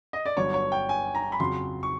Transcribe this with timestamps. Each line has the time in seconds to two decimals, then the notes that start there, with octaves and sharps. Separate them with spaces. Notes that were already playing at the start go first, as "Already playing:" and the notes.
0.13 D#5
0.26 D5
0.37 G1 G2 D3 F#3 C#5
0.54 C#5
0.72 G5
0.89 G#5
1.15 A#5
1.32 B5
1.40 F2 C#3 F#3 C6
1.83 C#6